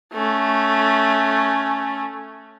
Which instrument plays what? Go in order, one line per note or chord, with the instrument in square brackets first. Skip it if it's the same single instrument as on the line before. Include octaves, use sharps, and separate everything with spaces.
[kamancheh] A3 C#4